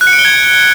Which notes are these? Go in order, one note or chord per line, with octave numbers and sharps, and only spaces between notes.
F#6
C#7
D7
G7
G#6